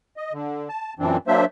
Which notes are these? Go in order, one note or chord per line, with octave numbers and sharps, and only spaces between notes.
D#5
D3
A5
F#2 A#2 E3 C4 D4
F#3 A#3 D4 C5 E5